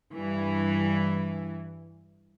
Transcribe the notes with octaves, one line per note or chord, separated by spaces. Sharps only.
G2 E3